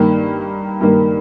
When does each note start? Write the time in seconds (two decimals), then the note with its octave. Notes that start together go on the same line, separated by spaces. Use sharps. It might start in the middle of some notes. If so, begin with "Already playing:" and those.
Already playing: G2 D#3 A#3
0.81 G2 D#3 A#3